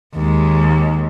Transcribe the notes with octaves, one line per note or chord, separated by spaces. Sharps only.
D#2 G#3